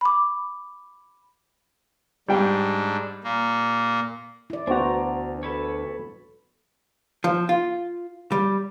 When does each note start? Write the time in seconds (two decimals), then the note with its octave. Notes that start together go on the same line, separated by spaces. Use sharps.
0.01 B5 D6
2.28 G#2 G3 D4 G5
3.24 A#2 A#3
4.50 E4 D5
4.67 D2 B3 D4 F#4 C5 A#5
5.43 A4 B4 C#5
7.24 F3
7.49 F4
8.32 G3